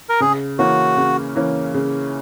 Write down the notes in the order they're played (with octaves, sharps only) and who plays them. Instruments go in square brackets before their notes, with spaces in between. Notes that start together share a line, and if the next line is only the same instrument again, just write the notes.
[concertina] A#4
[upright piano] C#3 [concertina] G#4
[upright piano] E3 A#3 C#4 [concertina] F#4
[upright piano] C#3
E3 A#3 C#4
C#3